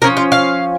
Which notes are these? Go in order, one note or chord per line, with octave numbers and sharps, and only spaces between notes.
F3 C#4 A#4
F4
F5